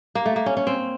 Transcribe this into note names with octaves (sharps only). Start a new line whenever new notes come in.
A#3
A3
A#3
C#4
C#4
C4